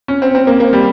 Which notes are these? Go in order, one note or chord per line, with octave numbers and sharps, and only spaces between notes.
C#4
C4
C4
A#3
A#3
G3